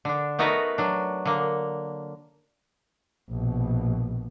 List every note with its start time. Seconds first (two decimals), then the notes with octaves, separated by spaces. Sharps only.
0.05 D3 D4
0.39 A3 B3 D#4 F#4 A#4 B4
0.78 F#3 D4
1.25 D3 A#3
3.30 A#1 B2